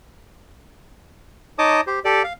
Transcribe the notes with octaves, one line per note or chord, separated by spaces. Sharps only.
D#4 C#5 D#5 A5 D6 D#6
G4 C5
G4 A4 D5
F5